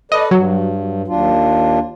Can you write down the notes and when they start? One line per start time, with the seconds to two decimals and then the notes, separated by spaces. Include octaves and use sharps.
0.12 A4 B4 D5 D#5
0.31 G2 F#3
1.08 D#2 D4 F4